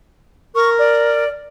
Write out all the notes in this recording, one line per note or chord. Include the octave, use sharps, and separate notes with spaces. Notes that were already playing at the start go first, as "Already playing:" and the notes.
A#4 C#6
D5